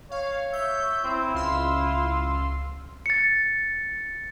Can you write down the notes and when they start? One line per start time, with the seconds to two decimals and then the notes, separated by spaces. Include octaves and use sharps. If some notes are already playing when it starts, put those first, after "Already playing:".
0.11 C#5 F5
0.53 E5 G6
1.04 C4 E4
1.34 C#2 F4 C6 E6
3.06 A6 C#7